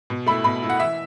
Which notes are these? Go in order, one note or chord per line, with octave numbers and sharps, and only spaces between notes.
B2
A3 E4 B5
B2 B5
A3 E4
F#5
E3 E5